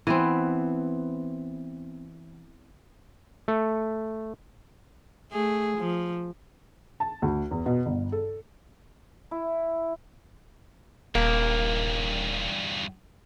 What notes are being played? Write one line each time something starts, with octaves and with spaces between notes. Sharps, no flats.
E3 B3 C4
A3
A3 G#4
F3
A5
D2
E2
B2
G1
A4
E4
D#1 E2 G2 A#3